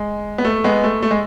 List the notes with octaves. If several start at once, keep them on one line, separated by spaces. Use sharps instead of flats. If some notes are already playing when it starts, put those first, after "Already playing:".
Already playing: G#3
B3
A3
G#3 B3
A3
A3
G#3